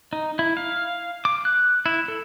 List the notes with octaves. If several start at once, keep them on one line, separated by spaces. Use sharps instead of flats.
D#4
E4
F5
D6
F#6
E4
A4